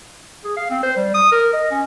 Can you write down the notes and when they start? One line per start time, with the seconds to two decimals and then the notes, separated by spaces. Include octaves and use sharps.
0.44 G#4
0.56 F5
0.70 C4
0.83 C5
0.97 G3
1.14 D#6
1.32 A#4
1.53 D#5
1.71 C#4